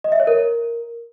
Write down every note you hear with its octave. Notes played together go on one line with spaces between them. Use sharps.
D#5
E5
C#5
A#4